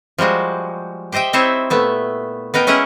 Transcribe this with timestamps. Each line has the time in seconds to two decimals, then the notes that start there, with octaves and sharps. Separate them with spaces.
0.18 F3 G3 G#3 F#4
1.12 G4 C5 D#5 E5 G5
1.33 C4 D#4 E4 C5 C#5 E5
1.70 A#2 A3 B3 E5
2.54 B3 D#4 A#4 G5
2.67 G#3 C#4 E4 A#4 D#5 F#5